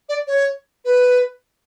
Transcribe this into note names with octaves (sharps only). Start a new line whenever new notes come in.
D5
C#5
B4